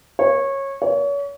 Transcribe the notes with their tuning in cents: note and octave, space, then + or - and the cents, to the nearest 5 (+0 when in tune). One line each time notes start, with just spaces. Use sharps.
C#5 -20
C#5 +35